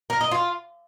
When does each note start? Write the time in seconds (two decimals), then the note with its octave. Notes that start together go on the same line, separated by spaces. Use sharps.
0.10 A#4
0.21 D#5
0.31 F4